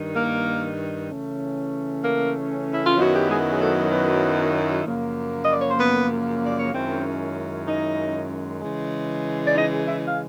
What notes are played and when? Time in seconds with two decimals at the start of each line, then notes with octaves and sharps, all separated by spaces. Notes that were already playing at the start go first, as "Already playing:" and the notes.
Already playing: G2 D#3
0.14 A#3 A#4
1.09 C#3 E3 A3 C#4
2.03 A#3 A#4
2.72 E4
2.86 F4
2.96 F#2 D#3 F#3 B3 E4 F#4
3.14 G4
3.28 G#3 G#4
3.50 G#4
3.59 A3 A4
3.91 B3 B4
4.85 F#2 C#3 F3 A#3
5.43 D#5
5.52 D5
5.61 C#5
5.70 C5
5.79 B3 B4
6.46 D5
6.59 C#5
6.73 F#2 D#3 G#3 C4 C#4 E4 C5
7.67 D#4 D#5
8.61 C#3 E3 G#3
9.46 D5
9.55 D#4 D#5
9.86 E4 E5
10.06 F5